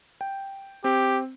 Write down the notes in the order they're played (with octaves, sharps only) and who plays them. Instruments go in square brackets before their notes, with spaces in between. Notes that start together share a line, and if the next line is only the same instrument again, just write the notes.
[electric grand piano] G5
[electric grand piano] C4 [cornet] G4